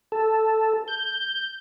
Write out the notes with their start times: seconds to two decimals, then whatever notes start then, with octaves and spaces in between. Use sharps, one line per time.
0.12 A4
0.88 G6